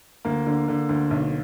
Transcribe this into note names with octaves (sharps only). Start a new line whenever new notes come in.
D2 A#3
D3
D3
D2
B1